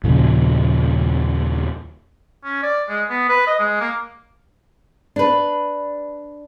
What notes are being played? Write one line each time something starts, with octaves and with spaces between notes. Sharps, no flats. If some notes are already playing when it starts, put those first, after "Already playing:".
D#2 A#2 C#3 F3
C#4
D5
G#3
B3
B4
D#5
G#3
A#3
D4 B4